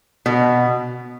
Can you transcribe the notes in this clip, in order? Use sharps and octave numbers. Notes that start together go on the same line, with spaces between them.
B2